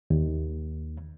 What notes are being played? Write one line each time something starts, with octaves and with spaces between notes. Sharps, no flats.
D#2